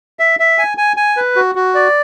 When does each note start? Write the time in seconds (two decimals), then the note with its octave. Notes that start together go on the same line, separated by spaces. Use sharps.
0.19 E5
0.40 E5
0.58 G#5
0.78 G#5
0.97 G#5
1.17 B4
1.36 F#4
1.55 F#4
1.75 D5